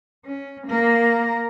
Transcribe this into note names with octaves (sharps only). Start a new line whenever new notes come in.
C#4
A#3 A#4